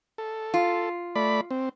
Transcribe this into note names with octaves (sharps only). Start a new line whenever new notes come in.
A4
F4
A3 D5 B5
C4